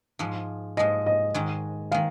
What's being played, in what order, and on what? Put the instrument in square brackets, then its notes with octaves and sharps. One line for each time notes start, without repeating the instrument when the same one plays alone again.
[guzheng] G#2 F3 G#3
[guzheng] G#2 F3 G#3 [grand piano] D#5
[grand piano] D#5
[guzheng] G#2 D#3 G#3
[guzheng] D#3 G#3 [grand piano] F5